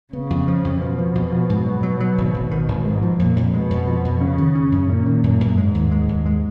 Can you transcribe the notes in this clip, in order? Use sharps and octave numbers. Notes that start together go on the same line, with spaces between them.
C#3 B3
F2
F3
F2
B2 F3
F3
F2
F3
G#2
F#3
F#3
F#3
G#1
G#1
D#3
G#1
G#2 G#3
F3
F2 A#2
F2
B2 G#3
F2
F3
F2
C#3 C#4
D#3
C#4
F#2
A#2 C#4
D#3
F#2
F#2
G#2 G#3
D#2
G#3
D#2
G#3